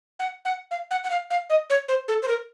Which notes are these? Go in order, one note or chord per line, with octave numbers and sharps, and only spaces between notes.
F#5
F#5
F5
F#5
F#5
F5
F5
D#5
C#5
C5
A4
C5
A#4